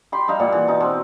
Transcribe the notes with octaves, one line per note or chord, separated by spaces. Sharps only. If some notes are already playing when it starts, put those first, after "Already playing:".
G4 B5 C6
G3 D#4 F5
A#2 D5 F#5
E3
B2 D#4
B2 C4